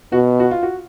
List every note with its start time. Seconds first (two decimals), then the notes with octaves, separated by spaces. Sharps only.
0.12 B2 F#4
0.40 F#4
0.51 F4
0.63 F#4